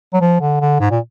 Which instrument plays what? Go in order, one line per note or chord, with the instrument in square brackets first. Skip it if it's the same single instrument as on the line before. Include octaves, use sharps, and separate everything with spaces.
[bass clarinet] F#3
F3
D3
D3
G#2
A#2